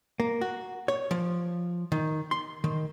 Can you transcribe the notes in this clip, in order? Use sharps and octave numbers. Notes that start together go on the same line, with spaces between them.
A#3
F#4
C#5
F3
D#3
C6
D#3